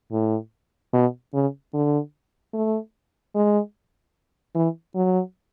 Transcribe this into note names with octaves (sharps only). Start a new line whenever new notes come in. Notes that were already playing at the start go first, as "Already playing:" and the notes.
A2
B2
C#3
D3
A3
G#3
E3
F#3